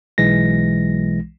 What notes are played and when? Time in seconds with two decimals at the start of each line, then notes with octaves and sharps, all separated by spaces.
0.18 B1 E3 G#3 A#6